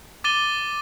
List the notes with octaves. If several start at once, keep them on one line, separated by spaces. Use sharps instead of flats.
D6 A6 D#7 G7